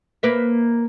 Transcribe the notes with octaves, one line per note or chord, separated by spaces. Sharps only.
A#3 B4 E5